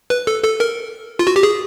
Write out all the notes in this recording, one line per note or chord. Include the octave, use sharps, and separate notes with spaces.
B4
A4
A4
A#4
F4
F#4
G4
G#4